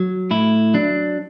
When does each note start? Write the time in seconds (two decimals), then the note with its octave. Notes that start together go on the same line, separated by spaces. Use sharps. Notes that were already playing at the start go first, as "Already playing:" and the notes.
Already playing: F#3
0.31 A2 E4
0.74 F#3 D4